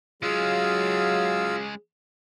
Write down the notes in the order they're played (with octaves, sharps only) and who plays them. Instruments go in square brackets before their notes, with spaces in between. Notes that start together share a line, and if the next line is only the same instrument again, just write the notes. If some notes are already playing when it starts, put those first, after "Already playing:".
[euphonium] F#3 [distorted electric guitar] G#3 C#4 [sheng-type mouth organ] F4 F5 E6 [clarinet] G#4